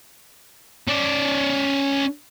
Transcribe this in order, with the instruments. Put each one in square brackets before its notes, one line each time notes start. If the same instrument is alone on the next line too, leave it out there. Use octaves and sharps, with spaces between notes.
[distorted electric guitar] C#4 D5